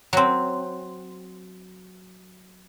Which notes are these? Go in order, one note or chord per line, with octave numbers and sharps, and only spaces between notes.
F#3 C4